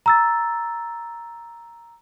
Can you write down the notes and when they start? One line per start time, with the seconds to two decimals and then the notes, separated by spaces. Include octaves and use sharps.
0.06 A#5 E6 A6